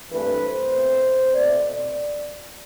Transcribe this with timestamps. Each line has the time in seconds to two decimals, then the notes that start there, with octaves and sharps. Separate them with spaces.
0.11 G2 E3 A3 C4 B4
0.42 C5
0.73 B2 A3 C4
1.34 B2 A3 C4 D5